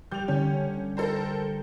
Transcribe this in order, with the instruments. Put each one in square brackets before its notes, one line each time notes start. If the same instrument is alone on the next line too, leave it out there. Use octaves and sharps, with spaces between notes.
[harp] G3 G4 [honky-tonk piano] G6 F7
[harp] D3 [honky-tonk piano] C#4
[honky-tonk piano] A4 A#4 C5